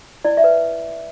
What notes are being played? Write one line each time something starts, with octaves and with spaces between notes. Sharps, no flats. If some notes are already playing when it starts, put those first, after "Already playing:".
E4 D5
E5
B4